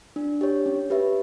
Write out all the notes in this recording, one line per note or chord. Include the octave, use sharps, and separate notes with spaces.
D4
G4 C#5
C#4
G4 B4 E5